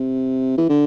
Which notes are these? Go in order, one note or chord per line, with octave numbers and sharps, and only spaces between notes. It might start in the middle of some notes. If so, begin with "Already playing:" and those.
Already playing: C3
E3
D3